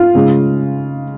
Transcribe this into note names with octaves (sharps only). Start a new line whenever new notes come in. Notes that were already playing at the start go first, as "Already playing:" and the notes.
Already playing: F4
C#3 G#3